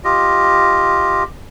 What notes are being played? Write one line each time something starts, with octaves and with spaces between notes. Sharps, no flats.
F4 G4 D#5